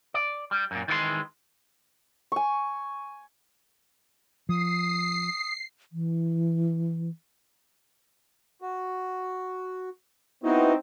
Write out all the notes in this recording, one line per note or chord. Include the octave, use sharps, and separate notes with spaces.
D5
G3
F#2 A#2
D#3 E3 G#3 F#5 C6
G#5 C#6
F3 D#6 C7
E3
F#4
B3 C4 D#4 E4 F#4